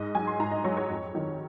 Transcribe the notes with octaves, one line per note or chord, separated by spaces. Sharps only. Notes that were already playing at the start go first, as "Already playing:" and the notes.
Already playing: G#2 D#5
F#3 G#5
C6
G#2 A#5
D#5
F#3 C#5
C#5
F2
D#3 F#3